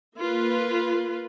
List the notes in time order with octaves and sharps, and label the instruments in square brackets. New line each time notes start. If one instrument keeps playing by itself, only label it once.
[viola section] A#3 F4 B4